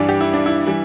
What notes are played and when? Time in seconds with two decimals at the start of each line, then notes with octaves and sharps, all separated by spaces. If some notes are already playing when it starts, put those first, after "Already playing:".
Already playing: G2 E3 G3 D4
0.09 G4
0.20 E4
0.33 D4
0.46 E4
0.67 E3 G3